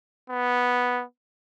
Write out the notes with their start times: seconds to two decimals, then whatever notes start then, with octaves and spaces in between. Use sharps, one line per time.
0.30 B3